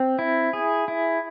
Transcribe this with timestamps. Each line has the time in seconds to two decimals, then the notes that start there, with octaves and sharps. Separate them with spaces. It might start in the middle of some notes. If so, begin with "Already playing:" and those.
Already playing: C4
0.19 E4
0.53 G#4
0.88 E4